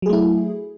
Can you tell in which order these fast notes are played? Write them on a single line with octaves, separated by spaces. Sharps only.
F#3 G#4 A3 E4